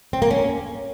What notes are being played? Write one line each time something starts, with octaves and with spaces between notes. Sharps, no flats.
C4
A#3
C#4